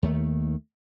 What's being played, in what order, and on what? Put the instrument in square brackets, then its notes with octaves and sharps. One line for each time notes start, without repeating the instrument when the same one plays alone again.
[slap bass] D#2 D#3 A3